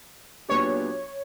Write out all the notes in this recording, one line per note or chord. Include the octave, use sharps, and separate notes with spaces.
A#2 F#3 B3 D4 G4 C#5